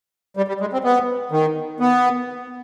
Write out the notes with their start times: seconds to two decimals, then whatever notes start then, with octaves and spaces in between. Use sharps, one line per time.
0.37 G3
0.48 G3
0.61 G#3
0.73 C4
0.84 B3
1.32 D#3
1.80 B3